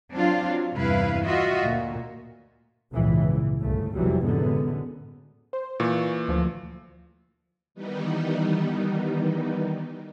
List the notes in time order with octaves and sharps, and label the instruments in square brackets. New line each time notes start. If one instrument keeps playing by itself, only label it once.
[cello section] F#3 C4 D4 F4
F#3
E2 G2 C3 E4 B4 F5
F4 F#4 D#5 E5
D2 A#2
[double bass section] G#1 C#2 A#2 C#3 E3
G1 C2 C#3 A3
F1 E2 C3 E3 F#3 G3
F#2 A2 D3 G#3 B3
[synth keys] C5
[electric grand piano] A#2 E3 [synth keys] C#6
[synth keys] D2 F3
[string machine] D#3 E3 G3 B3 D#4